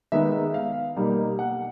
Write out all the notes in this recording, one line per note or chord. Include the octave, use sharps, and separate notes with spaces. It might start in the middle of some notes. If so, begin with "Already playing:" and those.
D#3 G#3 B3 D#4 E5
F5
B2 G3 A#3 D#4
F#5